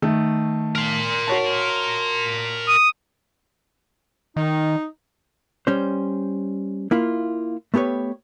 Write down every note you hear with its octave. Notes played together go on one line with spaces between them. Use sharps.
D#3 A3
A#4 C6
F#4 C#5 A5
D#6
D#3 D#4
G3 C#4 C5
A#3 E4 F4
A3 B3 G4 B4 C#5